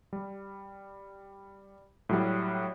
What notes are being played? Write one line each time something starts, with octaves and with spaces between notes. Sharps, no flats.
G3
A2 F#3 G3